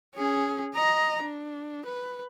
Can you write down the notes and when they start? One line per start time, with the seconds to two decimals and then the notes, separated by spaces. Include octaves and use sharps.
0.15 C#4 G#4
0.74 D#5 A#5
1.23 D4
1.86 B4